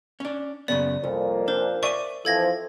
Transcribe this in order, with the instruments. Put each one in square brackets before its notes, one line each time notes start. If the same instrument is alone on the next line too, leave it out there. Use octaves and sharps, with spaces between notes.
[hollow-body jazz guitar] C#4 D4
[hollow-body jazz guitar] F#2 C#3 B3 [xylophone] D5
[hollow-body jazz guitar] C2 [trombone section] F2 A#2
[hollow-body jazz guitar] D4 [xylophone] A#4 C5
[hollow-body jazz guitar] D5 E5 G#5 [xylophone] C#6 D#7
[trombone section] F2 E3 F3 [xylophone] A4 G#6 A#6